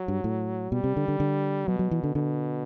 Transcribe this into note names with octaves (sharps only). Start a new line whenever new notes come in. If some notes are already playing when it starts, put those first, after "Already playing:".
Already playing: F#3
G2
A2
B2 G3
C3
D3
D3
D3
B2 F#3
F#3
E3
D3
B2 D3